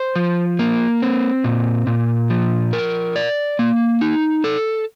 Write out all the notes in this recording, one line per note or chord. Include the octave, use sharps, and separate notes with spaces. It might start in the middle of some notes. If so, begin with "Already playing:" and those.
Already playing: C5
F3
A#3
C4
A#2
A#2
F3
A#4
D5
A#3
D#4
A4